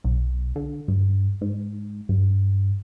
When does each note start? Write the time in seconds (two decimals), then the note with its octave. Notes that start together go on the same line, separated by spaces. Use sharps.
0.04 B1
0.56 D3
0.88 G2
1.41 G#2
2.09 G2